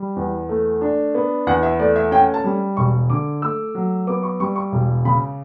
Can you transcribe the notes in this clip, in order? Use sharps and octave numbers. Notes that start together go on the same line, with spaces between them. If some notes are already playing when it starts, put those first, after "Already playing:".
Already playing: G3
E2
A3
D4
B3
E2 F#5
E5
A3 D5
E5
C#4 G5
A5
G3
E1 C#6
D3 D6
A3 E6
F#3
B3 D6
C#6
G3 C#6
C#6
E1
C#3 B5